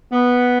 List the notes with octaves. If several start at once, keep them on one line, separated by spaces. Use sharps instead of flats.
B3